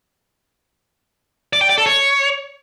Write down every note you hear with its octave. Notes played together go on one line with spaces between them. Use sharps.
D5
G5
D5
A4
C#5